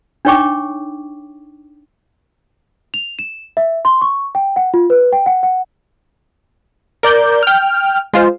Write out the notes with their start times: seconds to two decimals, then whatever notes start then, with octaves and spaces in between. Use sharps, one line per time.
0.25 D4 D#4 C#5 G5 C#6 D6
2.94 F7
3.19 E7
3.57 E5
3.85 C6
4.02 C#6
4.35 G5
4.56 F#5
4.74 F4
4.90 B4
5.12 G5
5.26 F#5
5.43 F#5
7.03 A#4 D5 G6
7.43 G5 F6
8.13 G#3 F4 C5